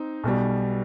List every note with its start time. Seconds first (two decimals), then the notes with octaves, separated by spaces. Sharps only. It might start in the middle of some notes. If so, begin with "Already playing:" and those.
Already playing: C4 D#4
0.24 B1 B2 G3